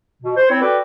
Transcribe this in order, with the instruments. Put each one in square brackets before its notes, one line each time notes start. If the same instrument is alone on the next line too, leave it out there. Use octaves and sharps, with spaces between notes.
[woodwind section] B2
C5
C4 E4 C#5
F#4 A4 B4 D5 G5